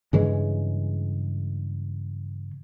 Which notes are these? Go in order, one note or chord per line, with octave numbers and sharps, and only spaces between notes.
G2 C#3 E3 G#3